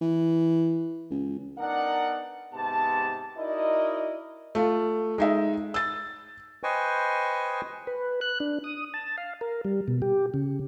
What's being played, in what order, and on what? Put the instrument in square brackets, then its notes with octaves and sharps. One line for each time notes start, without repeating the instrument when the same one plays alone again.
[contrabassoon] E3
C#2
[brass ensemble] B3 D4 D#4 A#4 D5 F#5
G#2 C3 B3 G4 A5
D#4 E4 F#4 A#4 D5 D#5
[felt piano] A3 F4
G#3 D#4 E5
E6 A6
[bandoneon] B4 C5 D#5 G5 G#5 C#6
[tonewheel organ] B4
F#6
D4
D#6
A5
F5
A#4
G3
B2
G4
C#3